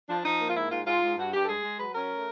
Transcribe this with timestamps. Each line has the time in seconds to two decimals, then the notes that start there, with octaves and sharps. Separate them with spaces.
0.09 F3 D4
0.25 F3 D#4
0.40 A#3
0.50 F4
0.56 G#2 E4
0.71 G#2 F4
0.86 G#2 F4
1.02 G#2
1.17 G2 F#4
1.33 G2 G4
1.43 A4
1.48 G#3 G#4
1.64 G#3
1.79 F#3 B4
1.94 C#4 A#4
2.10 A3